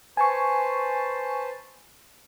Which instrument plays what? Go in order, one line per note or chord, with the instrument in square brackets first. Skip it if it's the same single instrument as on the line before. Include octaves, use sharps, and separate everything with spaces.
[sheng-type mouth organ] B4 C5 A5 [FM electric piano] G#5 C#6